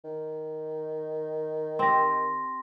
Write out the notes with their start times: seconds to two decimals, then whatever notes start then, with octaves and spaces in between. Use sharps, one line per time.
0.04 D#3
1.79 C4 G4 C6 A#6